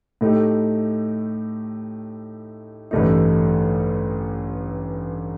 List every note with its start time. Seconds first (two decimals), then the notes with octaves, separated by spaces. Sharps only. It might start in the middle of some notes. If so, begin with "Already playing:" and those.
0.21 A2 A3 D#4 G4
2.91 A1 G2 D3 A3 D#4